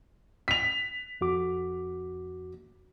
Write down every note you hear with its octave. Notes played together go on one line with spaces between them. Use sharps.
B6 F7
F2 F#4 D6